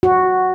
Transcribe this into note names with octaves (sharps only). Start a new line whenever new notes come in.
F#4